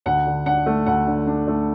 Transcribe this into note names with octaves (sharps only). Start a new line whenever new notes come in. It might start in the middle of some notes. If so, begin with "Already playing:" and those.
D2 F#5
D3
D4 F#5
A3
D2 F#5
D3
D4
A3